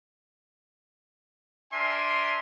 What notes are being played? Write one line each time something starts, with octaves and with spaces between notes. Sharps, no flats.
D4 A#4 E5 G#5 C6